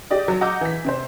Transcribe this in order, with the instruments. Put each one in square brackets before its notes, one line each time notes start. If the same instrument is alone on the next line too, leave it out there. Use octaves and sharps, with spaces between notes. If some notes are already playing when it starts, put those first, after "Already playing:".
[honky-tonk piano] G4 G#4 D5 D#5
F#3 A#5
D#5 F#5 A#5 D6 E6 G6
E3 B6
C3 C4 C5